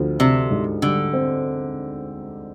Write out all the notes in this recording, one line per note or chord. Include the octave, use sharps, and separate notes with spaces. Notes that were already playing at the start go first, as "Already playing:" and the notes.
Already playing: D2 F3
C3 D4
G#2
D3 G3
C4